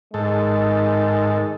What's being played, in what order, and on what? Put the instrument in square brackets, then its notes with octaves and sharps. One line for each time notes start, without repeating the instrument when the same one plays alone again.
[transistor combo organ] G#2 A4 [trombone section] D#3 G#3